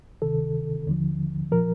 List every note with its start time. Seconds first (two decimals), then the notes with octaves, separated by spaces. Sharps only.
0.22 D2 C3 D#3 A4
0.87 D#2 D3 F3
1.52 A#2 F3 A#4